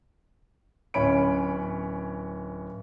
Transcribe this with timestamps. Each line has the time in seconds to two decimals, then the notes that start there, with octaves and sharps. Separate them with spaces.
0.94 D1 C#4 C#5 B5 D7